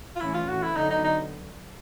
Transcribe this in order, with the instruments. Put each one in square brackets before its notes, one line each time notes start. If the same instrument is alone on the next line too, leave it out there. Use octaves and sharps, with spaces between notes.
[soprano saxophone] F4
[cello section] A2 E3 A3 C#4 [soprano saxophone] E4
[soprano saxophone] F4
[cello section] A2 E3 A3 [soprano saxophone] F#4
[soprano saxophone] E4
[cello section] D3 F#3 B3 [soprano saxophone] D#4
[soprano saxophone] D#4
D#4